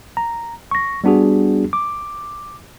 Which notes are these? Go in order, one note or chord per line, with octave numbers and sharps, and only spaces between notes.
A#5
C#6 A#6
G3 B3 D4 F#4 G#4
D6